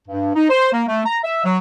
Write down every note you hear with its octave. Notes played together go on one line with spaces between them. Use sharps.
G2
D#4
C5
A#3
A3
A#5
E5
F#3